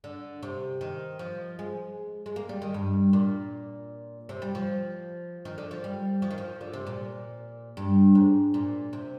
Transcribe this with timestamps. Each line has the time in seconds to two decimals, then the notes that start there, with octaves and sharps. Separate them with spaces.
0.04 D3
0.43 C3
0.81 D#3
1.19 F3
1.59 G#3
2.26 G#3
2.36 A#3
2.49 G3
2.62 D#3
2.74 G2
3.13 A#2
4.29 C3
4.42 G3
4.55 F3
5.45 D#3
5.58 D3
5.71 F3
5.84 G3
6.22 F3
6.31 D#3
6.38 F3
6.61 D3
6.73 C3
6.87 A#2
7.77 G2
8.15 G#2
8.54 A#2
8.93 C3